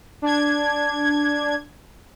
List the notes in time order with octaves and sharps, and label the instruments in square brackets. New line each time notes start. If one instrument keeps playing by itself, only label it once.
[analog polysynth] D4 G#6